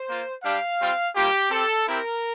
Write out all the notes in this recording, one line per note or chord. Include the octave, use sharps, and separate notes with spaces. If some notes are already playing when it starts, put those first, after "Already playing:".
Already playing: C5
A#3 F4
G3 D4 G4 F5
G3 C4 F4
G3 A#3 F4 G4
C4 G4 A4
C4 E4 G4 A#4